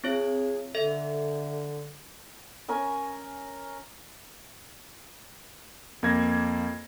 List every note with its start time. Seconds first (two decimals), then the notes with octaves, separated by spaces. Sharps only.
0.04 C4 F4 G#4 C#5
0.75 D3 A4 E5
2.69 C#4 A#4 G#5
6.03 F2 A#3 G#6 A#6